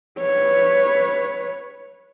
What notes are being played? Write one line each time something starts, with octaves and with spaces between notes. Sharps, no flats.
B4 C#5